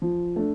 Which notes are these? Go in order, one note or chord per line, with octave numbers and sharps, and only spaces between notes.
F3
A3 D4